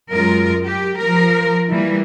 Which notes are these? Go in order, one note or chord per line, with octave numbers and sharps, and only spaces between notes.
F#2 G#3 F4 A#4
G4
F3 A#4
E3 G3 A#3